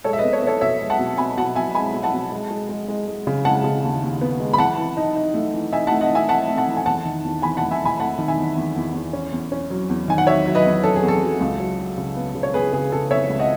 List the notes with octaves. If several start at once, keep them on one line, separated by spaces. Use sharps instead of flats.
G#3 A4 C#5
E5
B4 D#5
B3
A4 C#5
B3
A4 C#5
B2 C#5 E5
G#3
F#5 A5
B2
B2 G#5 B5
B2 F#5 A5
B2 E5 G#5
G#3 G#5 B5
B2
F#5 A5
B2
G#3
G#3
G#3
G#3
G#3
C#3
G#3 F#5 A5
C#3
D#2
D#2
B3
G#3
B5
E3 F#5 A5
E3
D#4
D#4
A3
E3
D#4 E5 G#5
F#5 A5
A3
D#5 F#5
E3
E5 G#5
D#4 F#5 A5
A3
F#5 A5
E3
G#5
E2 F#5 A5
D#3
E2
E2 G#5 B5
F#5 A5
A3
E5 G#5
E2 G#5 B5
A3 F#5 A5
D#3
E5 G#5
E2
E2
E2
E2
C#4
E2
C#4
F#3
E2
D#3 G#5
F#5
F#3 C#5 E5
F#3
B4 D#5
E2
C#4 A4
G#4
E2
A4
F#3
C#2
F#3
F#3
C#3
B3
C#3
C#5
B3 G#4 B4
C#3 G#4
C#3 A4
B3 C#5 E5
C#2
D#5 F#5